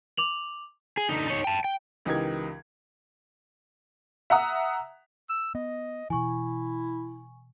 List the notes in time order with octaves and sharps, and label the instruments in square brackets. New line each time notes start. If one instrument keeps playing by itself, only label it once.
[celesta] D6 F7 F#7
[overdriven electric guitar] G#4
D3 D#4
D#4 C#5
G5 A5
G5
[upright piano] C#2 E3 D#4 G4 A#4 G#6
[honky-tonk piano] E5 F#5 A#5 D#6
[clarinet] E6
[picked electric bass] B3 [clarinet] D#5
[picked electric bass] B2 E3 [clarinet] E4 [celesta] G#5 C#6